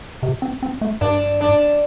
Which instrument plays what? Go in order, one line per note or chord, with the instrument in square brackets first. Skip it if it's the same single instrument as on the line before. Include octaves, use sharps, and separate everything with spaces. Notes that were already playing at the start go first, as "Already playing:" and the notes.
[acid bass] C3
C4
C4
A3
[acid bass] G2 [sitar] D4
[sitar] D4